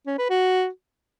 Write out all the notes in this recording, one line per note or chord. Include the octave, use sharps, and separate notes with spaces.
C#4
B4
F#4